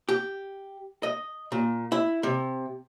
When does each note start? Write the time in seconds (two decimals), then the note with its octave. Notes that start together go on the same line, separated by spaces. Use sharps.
0.09 G4
1.03 D#5
1.52 A#2
1.92 E4
2.23 C3